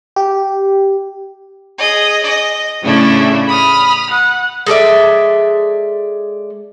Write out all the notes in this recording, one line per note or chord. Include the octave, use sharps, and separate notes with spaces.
G4
G#4 D#5
D#5
A2 C#3 A3 C#4 D4 E4
B5 D#6 F6
F#5
G#3 A4 D5 E5